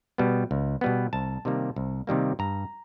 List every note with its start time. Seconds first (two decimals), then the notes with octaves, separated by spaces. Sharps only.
0.18 B2 G3 B3
0.51 C#2
0.81 B2 G3 B3
1.13 C2 A5
1.45 C3 D#3 G3 A#3
1.76 C2
2.07 C3 D#3 G3 A#3
2.39 G2 A#5